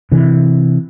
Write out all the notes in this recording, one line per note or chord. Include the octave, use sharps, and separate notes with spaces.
C3 E3